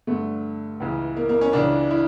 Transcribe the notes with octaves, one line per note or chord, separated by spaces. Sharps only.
G2 D3 A3
C#2 C#3 E3
A#3
A#3
C#4
C#2 C#3 E3 D4
E4